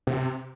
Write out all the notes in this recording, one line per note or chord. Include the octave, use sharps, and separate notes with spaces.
C3